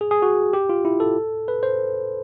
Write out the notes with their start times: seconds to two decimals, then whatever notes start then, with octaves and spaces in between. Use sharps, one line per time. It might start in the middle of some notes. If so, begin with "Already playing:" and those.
0.01 G#4
0.11 G#4
0.22 F#4
0.53 G4
0.69 F4
0.85 E4
1.00 A4
1.48 B4
1.63 C5